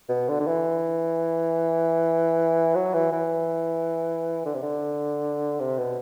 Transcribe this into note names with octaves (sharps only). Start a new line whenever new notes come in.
B2
D3
D3
E3
F#3
E3
E3
D3
C3
D3
C3
B2